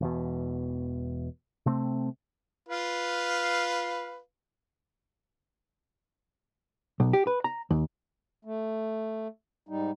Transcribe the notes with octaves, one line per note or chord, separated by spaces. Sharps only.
E1 E2 B2
C3 A3 C4
F4 B4 F5
B1
G4
B4
A#5
D#2
A3
G#2 G3 D#4